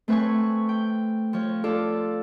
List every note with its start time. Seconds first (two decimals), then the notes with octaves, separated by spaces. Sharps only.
0.08 A3 C4 B4 C#5 G#5 C#6
0.69 G5
1.33 F3 C#5
1.64 F4 A4 D5